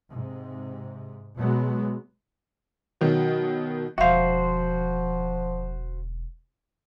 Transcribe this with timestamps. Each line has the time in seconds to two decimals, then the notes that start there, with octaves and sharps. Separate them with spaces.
0.11 G#2 C3
1.35 B2 F#3 G#3 B3
3.01 B2 D#3 F#3
3.98 E1 D3 F3 F#4 C5 E5 F5